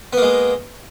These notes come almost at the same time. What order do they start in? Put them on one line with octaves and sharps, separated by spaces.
B3 A#3 G#3